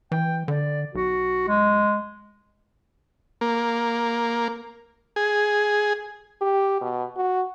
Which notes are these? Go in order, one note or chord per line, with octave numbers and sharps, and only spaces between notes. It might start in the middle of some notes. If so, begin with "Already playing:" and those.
E3 G5
D3 D5
B1 F#4
G#3
A#3
G#4
G4
B2
F#4